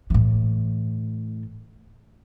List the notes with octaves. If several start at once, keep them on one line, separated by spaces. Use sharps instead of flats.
A2 E3